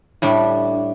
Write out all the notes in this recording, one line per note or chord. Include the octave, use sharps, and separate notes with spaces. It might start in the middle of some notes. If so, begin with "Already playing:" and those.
A2 G3 D4